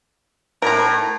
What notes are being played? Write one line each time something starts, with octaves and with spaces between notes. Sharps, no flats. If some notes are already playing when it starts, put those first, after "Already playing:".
A2 A#4 A#5